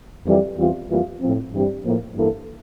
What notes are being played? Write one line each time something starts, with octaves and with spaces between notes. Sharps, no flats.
F2 E3 G3
E2 E3 G3 C4 F4
F2 E3 G3 A#3 F4
A2 F3 C4
G2 E3 G3 C4
A2 F3 A#3
G2 E3 A#3 E4 A4